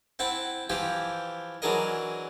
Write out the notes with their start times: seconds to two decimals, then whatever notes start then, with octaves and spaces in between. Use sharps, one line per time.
0.19 C4 E4 F#5 A5
0.70 E3 F3 E4 G4 C5
1.62 E3 F#3 D4 G#4 A#4 D#5